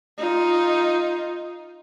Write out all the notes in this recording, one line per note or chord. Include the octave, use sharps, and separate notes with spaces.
D#4 F4